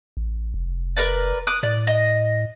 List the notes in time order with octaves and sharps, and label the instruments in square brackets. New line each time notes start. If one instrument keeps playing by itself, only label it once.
[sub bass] A1
F1
[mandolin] A#4 B4 D5
D6 D#6 F#6
[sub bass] A2 [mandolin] D5
[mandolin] D#5